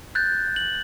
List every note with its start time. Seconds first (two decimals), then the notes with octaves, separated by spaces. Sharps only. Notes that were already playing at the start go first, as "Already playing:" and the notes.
0.15 F#6 G6 A6
0.56 F#7